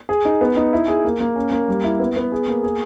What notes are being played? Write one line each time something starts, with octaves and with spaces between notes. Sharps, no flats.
G#4
D#4
B3
D#4
E4
G#4
A#3
A#3
C#4
A#3
G3
E4
B3
B3
G#4
A#3
G#4